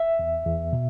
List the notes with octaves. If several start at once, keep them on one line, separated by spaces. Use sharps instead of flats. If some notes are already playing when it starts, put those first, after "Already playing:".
Already playing: E5
E2
E2
B2